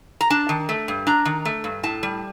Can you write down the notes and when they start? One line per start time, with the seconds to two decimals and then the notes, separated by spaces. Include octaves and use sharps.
0.21 A#5
0.30 D4 A5
0.49 D#3
0.69 A3
0.88 G2
1.07 D4 A#5
1.25 D#3
1.45 A3
1.64 G2
1.83 A2 A5
2.03 G3